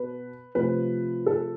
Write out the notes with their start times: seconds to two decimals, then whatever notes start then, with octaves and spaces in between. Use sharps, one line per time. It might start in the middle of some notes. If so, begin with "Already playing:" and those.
Already playing: B2 B4
0.55 C3 F3 A3 B4
1.26 A4